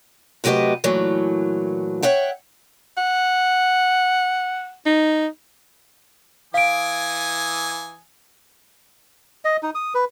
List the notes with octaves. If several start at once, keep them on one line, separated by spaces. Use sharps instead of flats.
C3 F#3 A3 G4 B4 D#5
A#2 E3 F#3 A3
C#5 E5 F#5 G5
F#5
D#4
E3 F5 G#5 D#6 D7
D#5
D#4
D#6
B4